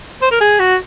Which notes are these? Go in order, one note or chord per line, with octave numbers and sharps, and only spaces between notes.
C5
A#4
G#4
F#4